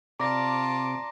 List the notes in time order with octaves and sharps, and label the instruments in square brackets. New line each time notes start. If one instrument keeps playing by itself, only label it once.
[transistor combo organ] C3 D6 [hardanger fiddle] F4 A5 [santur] D5 [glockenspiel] A#5 A#6